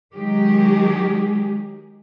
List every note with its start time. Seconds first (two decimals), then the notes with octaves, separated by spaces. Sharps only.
0.13 D#3 F#3 G#3 G4 G#4